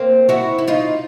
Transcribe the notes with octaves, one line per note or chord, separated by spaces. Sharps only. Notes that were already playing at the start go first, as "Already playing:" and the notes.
Already playing: A#3 C4
E4 F#4
E4
D#4 F4